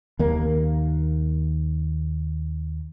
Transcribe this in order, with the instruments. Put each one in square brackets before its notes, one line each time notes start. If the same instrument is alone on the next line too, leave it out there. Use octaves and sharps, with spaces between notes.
[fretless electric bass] D#2 A#3